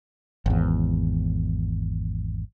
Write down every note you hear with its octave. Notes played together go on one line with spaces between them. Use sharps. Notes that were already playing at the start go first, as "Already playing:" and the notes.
G#1 E2